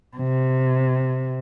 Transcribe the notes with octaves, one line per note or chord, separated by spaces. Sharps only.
C3